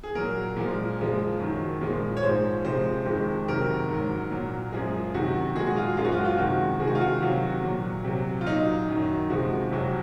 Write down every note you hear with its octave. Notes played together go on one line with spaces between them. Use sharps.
G#4
A#2 F#3 A#4
A#2 F3 G#3
F#2 C#3 F3 G#3
F#2 D#3 F#3
A#2 F3 G#3
C#5
G#2 F3 G#3 C5
C3 F3 G#3 C5
F2 D#3 G#3
C3 D#3 F#3 A#4
G#2
F#3
A#2 F#3
F#2 F3 G#3 G#4
C3 D#3 F#3 F#4
A#2 G#3 G#4
F#4
F4
F#2 F3 G#3 F4
F#4
F4
F#4
F4
C3 D#3 G#3 F#4
C3 D#3 G#3 G#4
F#4
F4
F#4
C3 D#3 F#3
A#2 F#3
C3 F#3
F4
A#2 F#3 D#4
F#2 D#3 F#3
C3 F3 G#3 F#4
F2 C3 F#3